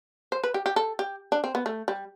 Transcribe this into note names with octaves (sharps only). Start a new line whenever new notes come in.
C5
B4
G4
G4
A4
G4
D4
C4
B3
A3
G3